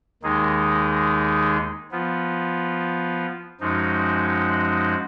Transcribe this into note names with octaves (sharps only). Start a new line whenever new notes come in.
D#2 D#3 G#3 D#4 G#4
F3 B3 F4
F#2 F3 G#3 D#4 F#4